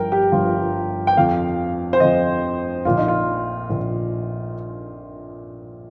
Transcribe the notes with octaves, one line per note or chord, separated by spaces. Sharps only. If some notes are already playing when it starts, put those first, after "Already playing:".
Already playing: G1 G2 F3 A#4 G5
G4
G1 G2 F3 F4
G5
F2 F3 F5
C5
F2 F3 D#5
A#1 A#2 F3 F4
D#4
F4
A#1 A#2 F3